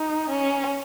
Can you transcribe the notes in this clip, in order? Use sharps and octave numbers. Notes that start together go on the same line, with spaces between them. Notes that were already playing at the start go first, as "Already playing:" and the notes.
Already playing: D#4
C#4